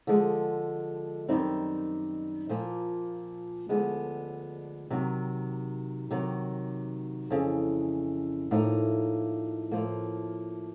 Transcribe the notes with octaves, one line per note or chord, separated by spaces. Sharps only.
D3 F3 G#3
F#2 D#3 G3 C4 D#4
A#2 F3 A#3
D2 D3 F3 G#3 B3
C3 D#3 F#3
C3 D#3 F#3
F2 C#3 E3
A2 F3 A#3 D#4
A2 F3 A#3